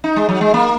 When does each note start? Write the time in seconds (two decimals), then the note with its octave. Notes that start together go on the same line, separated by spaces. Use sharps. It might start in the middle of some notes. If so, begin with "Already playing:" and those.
0.04 D#4
0.16 G#3
0.29 F#3
0.41 G#3
0.54 A#3